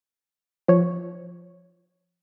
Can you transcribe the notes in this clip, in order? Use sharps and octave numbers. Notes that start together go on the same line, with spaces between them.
F3 C#5